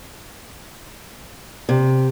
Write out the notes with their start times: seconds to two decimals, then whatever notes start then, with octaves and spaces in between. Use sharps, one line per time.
1.69 C3